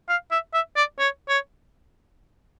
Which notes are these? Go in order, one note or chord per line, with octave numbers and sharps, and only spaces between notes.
F5
E5
E5
D5
C#5
C#5